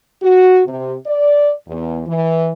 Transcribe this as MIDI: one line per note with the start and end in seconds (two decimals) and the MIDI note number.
0.22 0.61 66
0.66 0.94 48
1.06 1.52 74
1.68 2.01 40
2.07 2.51 52